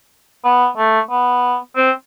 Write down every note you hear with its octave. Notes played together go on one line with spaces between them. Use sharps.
B3
A3
B3
C4